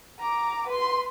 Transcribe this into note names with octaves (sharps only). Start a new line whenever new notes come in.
A#5 D6
B4 C6